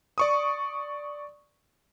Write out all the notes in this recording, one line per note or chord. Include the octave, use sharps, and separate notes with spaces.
D5 C#6 D#6